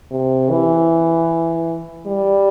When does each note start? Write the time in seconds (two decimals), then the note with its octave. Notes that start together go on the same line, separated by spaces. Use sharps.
0.12 C3
0.51 E3
2.06 G3